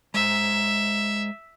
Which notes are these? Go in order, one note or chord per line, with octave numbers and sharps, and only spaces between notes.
G#3 C5 E5